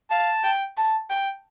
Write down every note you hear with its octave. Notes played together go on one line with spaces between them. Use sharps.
F5 A5
G5
A5
G5